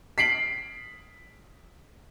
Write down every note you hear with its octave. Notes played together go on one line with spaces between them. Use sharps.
B6 C7 D7 F#7